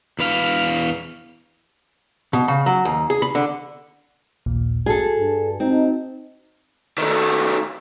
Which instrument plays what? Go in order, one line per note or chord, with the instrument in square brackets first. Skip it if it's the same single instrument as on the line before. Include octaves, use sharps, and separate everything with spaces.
[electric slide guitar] E2 B4 F5
[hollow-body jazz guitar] B2
C#3
F#3
D#2
G#4
B5
D3
[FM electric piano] A#1 D#2 A#2
[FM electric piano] F#4 A5 [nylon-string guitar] G#4 A4
[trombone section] G2
[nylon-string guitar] C4 [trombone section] D#4
[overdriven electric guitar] D#3 A3